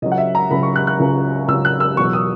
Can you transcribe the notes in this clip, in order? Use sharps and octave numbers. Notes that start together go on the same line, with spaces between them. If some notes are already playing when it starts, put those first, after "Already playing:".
C#2 C#3 F#3 D#5
F#5
E5
A#5
C#2 C#3 F#3 B5
C#6
F#6
F#6
C#2 C#3 F#3
C#2 C#3 F#3 E6
F#6
E6
E2 B2 F#3 C#6
D#6